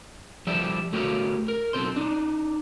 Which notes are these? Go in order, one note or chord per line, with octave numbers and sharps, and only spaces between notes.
F3 G3 G4 A4 D5 E5
A3 F#4 G4 A#4 C#5 F5
A#4
B1 G#2 C4 A4 C5 C6
D4 D#4